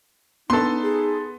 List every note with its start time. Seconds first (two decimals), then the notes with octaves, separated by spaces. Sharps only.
0.50 B3 D4 D#4 A4 C6
0.82 G#4